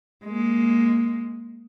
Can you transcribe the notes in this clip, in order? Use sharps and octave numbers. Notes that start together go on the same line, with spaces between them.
G#3 A#3